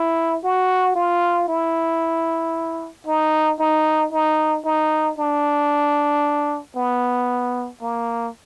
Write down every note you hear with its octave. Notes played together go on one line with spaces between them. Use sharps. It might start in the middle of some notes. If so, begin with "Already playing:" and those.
Already playing: E4
F#4
F4
E4
D#4
D#4
D#4
D#4
D4
B3
A#3